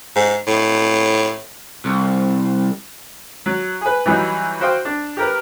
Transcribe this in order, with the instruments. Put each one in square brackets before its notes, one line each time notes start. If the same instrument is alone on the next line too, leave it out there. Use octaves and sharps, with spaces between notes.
[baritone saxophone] G#2
A2
[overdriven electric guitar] C2
[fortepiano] F#3
G#4 B4
E3 F#3 G3 D#4 F#4
F#4 C5 F5 G5 D#6
D4
G4 A#4 B4